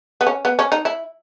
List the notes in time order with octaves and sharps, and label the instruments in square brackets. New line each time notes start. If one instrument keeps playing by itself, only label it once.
[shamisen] B3
C#4
B3
C#4
D#4
E4